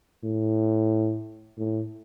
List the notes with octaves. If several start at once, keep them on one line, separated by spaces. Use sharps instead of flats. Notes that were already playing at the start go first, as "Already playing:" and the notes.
A2
A2